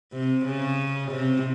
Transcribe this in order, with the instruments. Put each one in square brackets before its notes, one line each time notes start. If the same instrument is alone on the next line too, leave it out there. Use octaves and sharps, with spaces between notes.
[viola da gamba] C3
C#3
C3